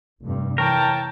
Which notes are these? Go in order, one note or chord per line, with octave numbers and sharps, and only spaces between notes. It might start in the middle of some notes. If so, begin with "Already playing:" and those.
F1 G2
E3 A#4 C#5 G5 A5